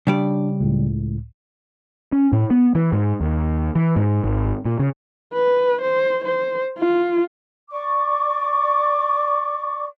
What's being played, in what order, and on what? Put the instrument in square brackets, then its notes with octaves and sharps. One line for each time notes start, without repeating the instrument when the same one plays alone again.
[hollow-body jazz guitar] C#3 G3 D5 [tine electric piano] D4
[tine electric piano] C#2 A2
[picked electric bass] C#4
A2
B3
E3
G#2
D#2
E3
G#2
G#1
A#2
C#3
[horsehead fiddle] B4
C5
C5
F4
[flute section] D5 C#6 D6